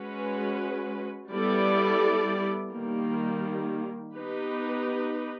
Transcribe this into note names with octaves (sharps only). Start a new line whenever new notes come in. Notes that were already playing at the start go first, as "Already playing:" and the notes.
Already playing: G#3 C#4 F#4 B4
G3 B3 E4 A4 D5
D#3 G3 A#3
B3 D#4 G4 B4